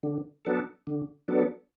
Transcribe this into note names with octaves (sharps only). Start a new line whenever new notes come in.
D3
F#3 B3 D4 A4
D3
F#3 B3 D4 A4